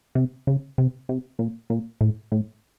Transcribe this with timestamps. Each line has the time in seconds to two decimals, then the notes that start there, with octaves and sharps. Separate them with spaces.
0.15 C3
0.47 C#3
0.78 C3
1.09 C3
1.39 A#2
1.70 A#2
2.01 A2
2.32 A2